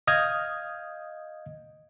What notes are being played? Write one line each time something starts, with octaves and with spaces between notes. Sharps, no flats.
D#5 F5 D#6 F6 G6 G#6